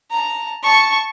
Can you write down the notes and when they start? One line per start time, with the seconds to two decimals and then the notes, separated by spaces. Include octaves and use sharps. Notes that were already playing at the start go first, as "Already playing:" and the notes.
0.11 A5 A#5
0.63 A5 C#6